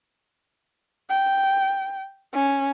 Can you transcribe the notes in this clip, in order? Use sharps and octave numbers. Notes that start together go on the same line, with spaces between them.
G5
C#4